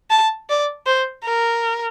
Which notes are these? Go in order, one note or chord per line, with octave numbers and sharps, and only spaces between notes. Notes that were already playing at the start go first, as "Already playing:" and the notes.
A5
D5
C5
A#4